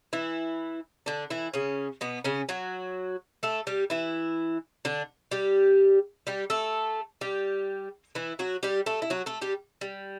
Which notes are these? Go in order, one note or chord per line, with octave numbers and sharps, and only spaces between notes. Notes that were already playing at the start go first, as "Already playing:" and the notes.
E3 E4
D3 D4
E3 E4
C#3 C#4
B2 B3
C#3 C#4
F#3 F#4
A3 A4
G3 G4
E3 E4
D3 D4
G3 G4
G3 G4
A3 A4
G3 G4
E3 E4
F#3 F#4
G3 G4
A3 A4
E4
F#3 F#4
A3 A4
G3 G4
G3